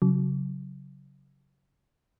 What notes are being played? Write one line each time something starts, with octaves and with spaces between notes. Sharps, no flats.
C#3 F#3